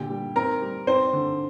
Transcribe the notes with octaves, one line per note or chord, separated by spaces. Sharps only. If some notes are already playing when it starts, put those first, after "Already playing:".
Already playing: A#2 D3 G4 G5
G3
C4 A#4 A#5
G3
C4 C5
D3